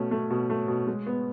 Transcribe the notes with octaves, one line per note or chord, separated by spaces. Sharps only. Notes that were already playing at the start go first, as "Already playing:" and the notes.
Already playing: B2 A3 C#4
A3
B2
A3
B2
G#3
B3